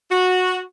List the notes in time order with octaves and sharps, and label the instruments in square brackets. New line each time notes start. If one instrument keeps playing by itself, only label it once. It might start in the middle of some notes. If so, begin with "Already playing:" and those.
[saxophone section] F#4